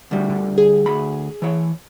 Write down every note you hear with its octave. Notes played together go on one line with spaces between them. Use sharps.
D2 G3
D3
G#4
D2 B5
E3 C#5